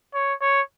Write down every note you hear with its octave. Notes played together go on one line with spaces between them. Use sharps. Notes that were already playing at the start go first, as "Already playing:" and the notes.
C#5
C#5